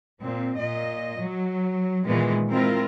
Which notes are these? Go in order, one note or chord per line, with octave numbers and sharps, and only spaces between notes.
A#2 C4
A#2 D#5
F#3
A#2 D#3 E3 G#3 B3
G#3 C4 E4 F4 A#4